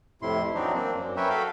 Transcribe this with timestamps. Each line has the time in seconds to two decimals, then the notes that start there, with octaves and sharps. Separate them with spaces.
0.22 F2 A2 C3 E4 C6
0.55 E3 F#3 C4 D4 D#4
0.75 A#3 C4 D4
0.95 F#2
1.17 A#4 B4 C#5 E5 G5 G#5
1.30 F#4 A4 F5 G5 B5